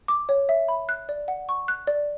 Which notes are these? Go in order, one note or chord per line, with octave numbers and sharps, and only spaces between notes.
D6
C#5
E5
B5
F#6
D5
F#5
C#6
F#6
D5